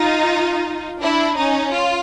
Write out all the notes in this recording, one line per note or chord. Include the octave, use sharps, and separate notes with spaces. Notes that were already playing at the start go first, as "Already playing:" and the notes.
Already playing: D#4 F4
D4 E4
C#4 D#4
F4